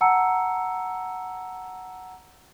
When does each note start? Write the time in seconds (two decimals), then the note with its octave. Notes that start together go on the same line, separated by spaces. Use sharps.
0.01 F#5 A5 A#5 E6 C#7